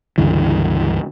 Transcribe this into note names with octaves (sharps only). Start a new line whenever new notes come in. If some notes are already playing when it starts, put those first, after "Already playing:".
C#2 G2 D3 E3